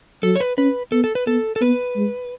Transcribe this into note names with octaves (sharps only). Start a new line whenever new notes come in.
F#3 A4
C#5
B4
C#4 B4
B3 A4
A4
B4
B3 A4
A4
B3 B4
G#3